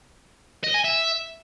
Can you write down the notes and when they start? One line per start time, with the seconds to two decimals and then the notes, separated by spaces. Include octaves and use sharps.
0.64 D#5
0.74 G#5
0.84 E5